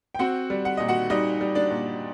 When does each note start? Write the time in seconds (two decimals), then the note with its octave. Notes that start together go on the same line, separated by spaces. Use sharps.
0.15 G5
0.19 C4 F#4 F#5
0.50 G3
0.65 F#5
0.77 A#2 D#5
0.88 F#4 F#5
1.10 G3 D#4 D#5
1.41 G3
1.55 D4 D5
1.70 A#2